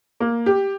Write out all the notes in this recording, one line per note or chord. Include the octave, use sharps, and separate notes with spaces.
A#3
G4